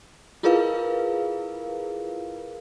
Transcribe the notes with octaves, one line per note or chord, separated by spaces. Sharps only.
E4 F4 G#4 A#4 B4 F5